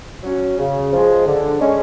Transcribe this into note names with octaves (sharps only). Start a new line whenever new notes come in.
F#3 C#4 F#4
C#3
F3 G#3
D3
G#3 C#4